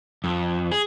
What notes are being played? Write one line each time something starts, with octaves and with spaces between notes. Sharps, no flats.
F2
G#4